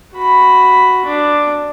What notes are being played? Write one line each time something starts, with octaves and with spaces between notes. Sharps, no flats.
F#4 B5
D4